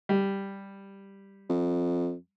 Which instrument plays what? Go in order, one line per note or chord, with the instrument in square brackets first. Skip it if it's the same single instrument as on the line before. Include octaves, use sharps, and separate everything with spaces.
[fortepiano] G3
[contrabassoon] F2